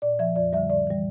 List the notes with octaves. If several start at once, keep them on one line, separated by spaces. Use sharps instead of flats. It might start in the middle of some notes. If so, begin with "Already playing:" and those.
A#2 D5
F3 E5
F2 D5
D3 G3 E5
A2 D5
E3 G3